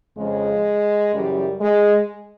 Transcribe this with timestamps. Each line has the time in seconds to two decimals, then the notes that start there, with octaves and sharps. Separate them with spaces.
0.17 F2 C#3 F3 G#3
1.13 F#2 C#3 E3 G3
1.60 G#3